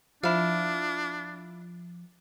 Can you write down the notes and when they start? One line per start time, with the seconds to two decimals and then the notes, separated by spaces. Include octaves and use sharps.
0.23 F3 D4 E4 F5